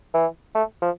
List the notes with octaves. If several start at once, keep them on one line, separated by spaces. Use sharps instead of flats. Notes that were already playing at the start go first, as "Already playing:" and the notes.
E3
A3
F3